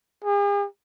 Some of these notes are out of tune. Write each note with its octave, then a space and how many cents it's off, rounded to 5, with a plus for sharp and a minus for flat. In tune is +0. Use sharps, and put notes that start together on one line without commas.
G#4 -45